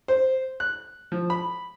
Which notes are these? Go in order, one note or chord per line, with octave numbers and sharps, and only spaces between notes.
C5
F#6
F3
B5